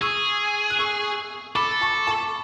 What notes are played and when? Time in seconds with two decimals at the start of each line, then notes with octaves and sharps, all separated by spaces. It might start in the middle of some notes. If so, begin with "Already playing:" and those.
0.02 G#4 C#6 E6
0.70 F#6
0.79 C#6 E6
1.55 A4 B5 D6
1.81 A5 C#6
2.07 A5 C#6